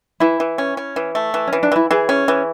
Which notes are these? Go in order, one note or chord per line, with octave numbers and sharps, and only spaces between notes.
E3 E4
E3
C#4
C#4
E3
A3
E3
C#4
E3
D4
E3 E4
E3 G#4
C#4
E3